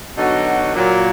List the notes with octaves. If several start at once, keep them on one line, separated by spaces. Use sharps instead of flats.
D3 F#3 B3 D#4 F#4
A#2 F#3 A#3